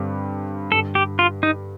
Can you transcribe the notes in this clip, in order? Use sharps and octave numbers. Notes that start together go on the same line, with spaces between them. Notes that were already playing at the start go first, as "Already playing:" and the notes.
Already playing: G2 D3 G3 C4 G4
G2 D3 G3 A4
G4
F4
D#4